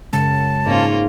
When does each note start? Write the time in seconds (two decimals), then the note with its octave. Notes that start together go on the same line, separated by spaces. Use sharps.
0.13 F#2 C#3 G#3 A5
0.66 G#2 A#3 C#4 F4